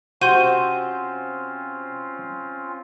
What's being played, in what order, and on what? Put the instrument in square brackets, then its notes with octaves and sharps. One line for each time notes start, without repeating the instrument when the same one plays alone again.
[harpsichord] C3 [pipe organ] C4 C#4 F4 [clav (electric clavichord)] F#4 [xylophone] C6 G6 D#7